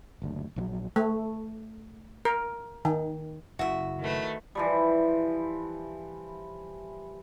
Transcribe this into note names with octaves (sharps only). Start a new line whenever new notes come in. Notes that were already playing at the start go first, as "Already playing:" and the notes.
F#1 D2
A#1 E3 F#3
A3
A#4
D#3
F#1 C#3 E4 F#4 E5
D#3 A3 B4
E3 F3 G3